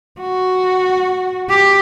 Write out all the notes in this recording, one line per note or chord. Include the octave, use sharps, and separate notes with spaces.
F#4
G4